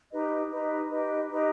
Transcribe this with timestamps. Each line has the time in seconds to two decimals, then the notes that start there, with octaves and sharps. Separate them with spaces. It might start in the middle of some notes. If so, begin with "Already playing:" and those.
0.12 D#4 G4 B4 D#5
0.51 D#4 G4 B4 D#5
0.89 D#4 G4 B4 D#5
1.28 D#4 G4 B4 D#5